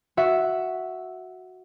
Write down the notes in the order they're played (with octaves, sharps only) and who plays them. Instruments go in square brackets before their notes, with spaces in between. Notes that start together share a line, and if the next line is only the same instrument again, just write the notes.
[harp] F#4 E5